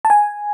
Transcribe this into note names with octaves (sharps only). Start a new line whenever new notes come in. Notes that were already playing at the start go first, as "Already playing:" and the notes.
A5
G#5